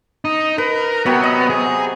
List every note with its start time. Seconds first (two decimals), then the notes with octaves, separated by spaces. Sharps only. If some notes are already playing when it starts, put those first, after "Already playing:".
0.25 D#4
0.58 A#4 B4
1.06 C3 F#3 B3
1.23 D#5
1.50 G#4